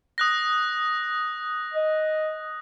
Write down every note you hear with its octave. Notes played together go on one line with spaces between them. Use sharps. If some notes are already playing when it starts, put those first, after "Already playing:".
D#6 F#6 A#6
D#5